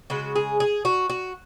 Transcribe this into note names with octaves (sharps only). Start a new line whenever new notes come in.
C#3 G#3 F#4
G#4
G#4
F#4
F#4